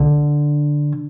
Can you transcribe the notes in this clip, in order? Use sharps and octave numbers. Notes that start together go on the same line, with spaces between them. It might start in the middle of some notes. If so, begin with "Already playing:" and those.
Already playing: D3